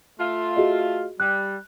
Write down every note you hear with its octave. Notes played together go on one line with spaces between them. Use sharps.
A3 F4
F#4 G#4 D#5
G3 F#6